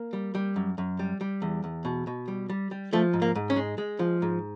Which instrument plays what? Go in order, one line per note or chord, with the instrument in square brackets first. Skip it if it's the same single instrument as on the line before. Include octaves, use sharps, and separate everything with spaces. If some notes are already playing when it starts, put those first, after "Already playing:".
Already playing: [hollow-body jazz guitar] A#3
G3
G3
F#2
F#2
G3
G3
E2
E2
B2
B2
G3
G3
G3
F3 A3
G#2
A#3
G#2
C#4
G#3
G#3
F3
G#2